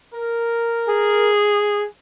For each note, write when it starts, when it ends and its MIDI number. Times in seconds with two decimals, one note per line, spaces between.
0.14 1.31 70
0.88 1.85 68